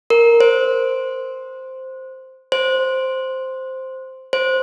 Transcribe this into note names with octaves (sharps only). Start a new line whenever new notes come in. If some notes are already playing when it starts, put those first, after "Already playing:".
A#4
C5
C5
C5